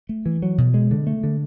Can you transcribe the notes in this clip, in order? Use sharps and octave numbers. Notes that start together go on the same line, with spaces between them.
A3
E3
F#3
B2
G#3
D3
A3
D3